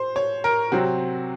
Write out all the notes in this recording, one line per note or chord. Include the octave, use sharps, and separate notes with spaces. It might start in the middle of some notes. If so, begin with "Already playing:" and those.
Already playing: C5
C#5
A#4
C3 F#3 C4 F#4